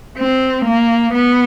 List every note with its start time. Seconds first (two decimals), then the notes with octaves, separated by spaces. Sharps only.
0.18 C4
0.65 A#3
1.13 B3